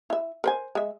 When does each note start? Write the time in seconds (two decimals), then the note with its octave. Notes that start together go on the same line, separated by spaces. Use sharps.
0.10 E4 E5
0.44 A#4 C5 G#5
0.75 G#3 E5